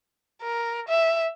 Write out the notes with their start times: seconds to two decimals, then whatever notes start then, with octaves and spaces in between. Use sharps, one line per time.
0.43 A#4
0.89 E5